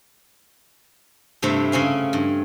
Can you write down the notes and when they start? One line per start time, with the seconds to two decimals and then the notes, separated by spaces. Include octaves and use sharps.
1.42 G2 C3 A3 C4 E4
1.72 C#3 C4 C#4 F5
2.13 G2